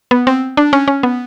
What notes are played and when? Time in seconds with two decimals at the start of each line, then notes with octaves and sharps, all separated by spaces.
0.11 B3
0.27 C4
0.57 D4
0.73 C#4
0.88 C#4
1.03 B3